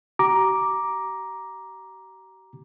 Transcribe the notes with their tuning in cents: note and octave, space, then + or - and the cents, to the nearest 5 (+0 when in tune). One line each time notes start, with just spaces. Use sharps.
G4 -45 A#5 +10 D6 +0